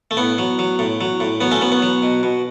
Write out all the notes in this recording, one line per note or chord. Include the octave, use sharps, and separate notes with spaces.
A3
A2 B3
F#3
F#3
A2
F#3
A2
F#3 B3
A3 C#4
F#3 B3
B3
F#3
B2
B2